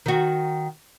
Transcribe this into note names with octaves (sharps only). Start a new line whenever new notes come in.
D#3 F#4